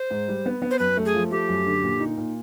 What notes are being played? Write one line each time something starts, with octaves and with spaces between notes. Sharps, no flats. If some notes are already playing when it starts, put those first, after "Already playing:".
Already playing: C5
G#2
G3
B3
B3
C5
F#2 B4
A3
G#4
F3
A3 G4
F#2
D3
A#2
D#4
A#2